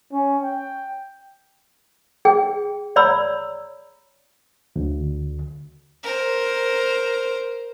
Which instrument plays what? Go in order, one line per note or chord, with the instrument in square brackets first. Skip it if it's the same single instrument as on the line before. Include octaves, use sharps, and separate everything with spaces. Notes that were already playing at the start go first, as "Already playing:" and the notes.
[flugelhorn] C#4
G5
[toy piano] G#4 G5
C#5 D5 A#5 B5 E6
[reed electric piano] D2
[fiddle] A#4 C5